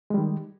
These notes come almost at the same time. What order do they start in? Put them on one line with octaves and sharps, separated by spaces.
G#3 G3 D#3